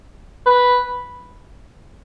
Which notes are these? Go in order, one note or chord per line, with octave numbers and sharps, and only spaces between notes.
B4